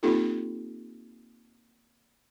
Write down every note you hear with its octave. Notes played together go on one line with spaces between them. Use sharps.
A#3 C4 D#4 F4 G4 A4